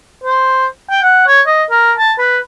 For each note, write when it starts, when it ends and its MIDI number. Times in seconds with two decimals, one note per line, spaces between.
0.24 0.66 72
0.90 1.01 79
1.03 1.23 78
1.27 1.41 73
1.46 1.63 75
1.70 1.92 70
1.98 2.12 81
2.19 2.38 71